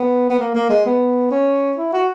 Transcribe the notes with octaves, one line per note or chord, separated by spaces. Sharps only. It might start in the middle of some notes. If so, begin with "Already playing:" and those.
Already playing: B3
B3
A#3
A#3
G#3
B3
C#4
E4
F#4